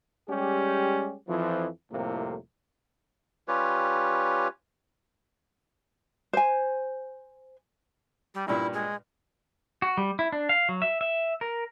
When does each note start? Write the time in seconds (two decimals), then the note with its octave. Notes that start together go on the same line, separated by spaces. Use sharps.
0.29 G3 G#3 C#4 G4
1.28 F2 E3 F3
1.92 C2 F2 A2 C3 A#3
3.48 G3 C#4 F4 G4 B4 C#5
6.33 C5 G#5
8.34 G3
8.48 G2 A#2 E4
8.73 G#3
9.82 F#4
9.97 G3
10.19 E4
10.32 D4
10.49 F5
10.69 F#3
10.82 E5
11.01 E5
11.41 A#4